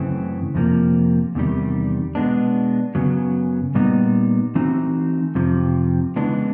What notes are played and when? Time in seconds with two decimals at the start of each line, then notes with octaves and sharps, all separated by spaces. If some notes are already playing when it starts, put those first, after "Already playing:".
Already playing: F#2 C#3 E3 A3 C4
0.55 F2 C3 F3 A#3
1.35 E2 C3 D#3 G3
2.15 B2 G#3 B3 D4
2.95 F#2 C#3 F#3 B3
3.75 A#2 G3 B3 D#4
4.55 E3 A3 C4 D#4 F#4
5.35 F2 C3 F3
6.16 C#3 E3 G#3 B3 D4